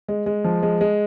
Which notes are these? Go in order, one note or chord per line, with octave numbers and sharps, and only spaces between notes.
G#3
G#3
F3
G#3
G#3